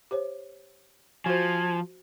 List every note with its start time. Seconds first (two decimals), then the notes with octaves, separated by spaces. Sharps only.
0.11 G4 C5 C#5
1.26 F3 F#4 C5 G#5